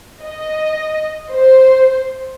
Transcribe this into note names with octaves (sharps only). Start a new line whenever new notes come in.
D#5
C5